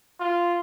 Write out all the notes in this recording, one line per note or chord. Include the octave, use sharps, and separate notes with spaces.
F4